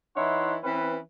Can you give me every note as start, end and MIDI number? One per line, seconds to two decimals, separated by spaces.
0.16 0.56 52
0.16 0.56 63
0.16 0.56 64
0.16 0.56 73
0.16 0.56 78
0.16 0.56 84
0.63 0.98 52
0.63 0.98 60
0.63 0.98 61
0.63 0.98 71